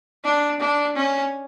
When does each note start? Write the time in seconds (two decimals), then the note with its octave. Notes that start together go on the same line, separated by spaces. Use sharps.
0.24 D4
0.60 D4
0.95 C#4